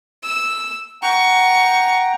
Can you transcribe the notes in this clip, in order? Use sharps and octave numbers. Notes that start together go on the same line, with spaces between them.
E6
F#5 G5 A#5 C#6